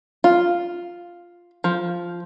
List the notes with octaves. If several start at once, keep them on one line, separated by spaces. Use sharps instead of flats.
F4
F3